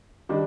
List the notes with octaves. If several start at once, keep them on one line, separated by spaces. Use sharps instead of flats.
D#3 G3 D4